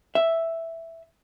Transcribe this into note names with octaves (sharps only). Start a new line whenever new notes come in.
E5